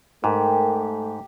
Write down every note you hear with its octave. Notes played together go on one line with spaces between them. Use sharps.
G#2 A3 G4 A#4